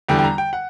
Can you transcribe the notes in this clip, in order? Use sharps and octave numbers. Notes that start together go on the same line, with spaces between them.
E2 D3 G3 G5
G5
A#5
G5
F#5